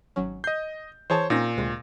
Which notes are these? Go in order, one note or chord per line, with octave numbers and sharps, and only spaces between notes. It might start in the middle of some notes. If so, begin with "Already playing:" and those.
G#1 F#3 C#4
D#5 G6 C7
E3 G#4 C5 C#5 A5
A#2 C4 C#4 D#4 A#6
D2 C3 G#3